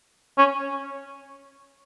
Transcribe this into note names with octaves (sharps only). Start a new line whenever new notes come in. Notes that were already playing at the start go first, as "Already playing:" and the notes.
C#4